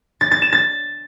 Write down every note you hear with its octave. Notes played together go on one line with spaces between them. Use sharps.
A6
A6
E7
A6